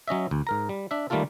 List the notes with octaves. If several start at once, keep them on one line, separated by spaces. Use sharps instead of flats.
F#3 C#4 D#5 E5
D2
G#2 A#4 A#5
G3
D4 E5
D#3 G3 A3 A#3 F4 A4